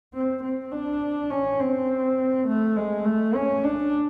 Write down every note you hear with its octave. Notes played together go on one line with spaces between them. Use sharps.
C4
C4
D4
C#4
C4
A3
G#3
A3
C#4
D4